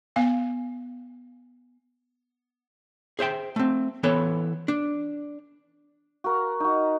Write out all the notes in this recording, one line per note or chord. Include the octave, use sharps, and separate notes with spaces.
B3 F5 G#5
G#4 C5 E5 G5
A3 C4
E3 B3 A4 C#5
D4
F#4 A#4
D#4 F#4